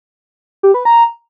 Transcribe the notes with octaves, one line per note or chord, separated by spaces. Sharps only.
G4
B4
A#5